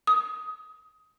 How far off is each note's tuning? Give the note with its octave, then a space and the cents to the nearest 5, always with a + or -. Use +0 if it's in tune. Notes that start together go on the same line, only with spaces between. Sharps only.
D#6 +20